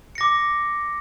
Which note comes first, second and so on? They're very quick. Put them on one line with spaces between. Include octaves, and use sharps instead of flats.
C#7 A#6 D6